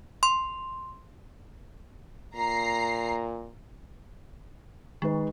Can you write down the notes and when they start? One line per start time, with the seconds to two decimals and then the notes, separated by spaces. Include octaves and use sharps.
0.23 C6
2.35 A#2 A#5 C7
5.02 D#3 G#3 D#4 B4